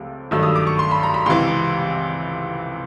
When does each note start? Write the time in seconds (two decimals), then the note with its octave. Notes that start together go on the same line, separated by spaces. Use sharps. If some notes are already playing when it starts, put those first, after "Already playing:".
Already playing: C#2 C3 F3 A3
0.31 G2 D#3 F#3 A3 E6
0.43 D#6
0.56 D6
0.67 C#6
0.79 C6
0.91 B5
1.03 A#5
1.14 B5
1.26 C#2 C3 E3 C6